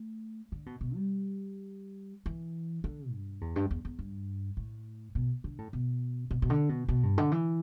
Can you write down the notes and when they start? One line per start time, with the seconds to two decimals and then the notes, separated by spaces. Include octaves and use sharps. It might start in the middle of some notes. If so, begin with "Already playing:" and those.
Already playing: A3
0.52 D3
0.66 B2
0.81 B2
0.95 G3
2.26 E3
2.84 D3
3.12 G2
3.41 E2
3.56 G2
3.71 E2
3.85 E2
3.99 G2
4.57 A2
5.15 B2
5.44 D3
5.58 A2
5.73 B2
6.31 B2
6.42 B2
6.50 D3
6.69 B2
6.88 B2
7.03 G2
7.18 D3
7.32 E3